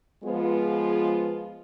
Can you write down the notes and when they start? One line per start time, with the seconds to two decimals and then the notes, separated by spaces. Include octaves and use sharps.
0.24 F3 G#3 B3 F4 G#4